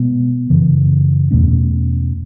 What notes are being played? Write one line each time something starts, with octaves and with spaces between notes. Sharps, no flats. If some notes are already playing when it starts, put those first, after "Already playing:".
Already playing: B2 G#3 B3
F#2 C#3 E3
E2 B2 A3 C#4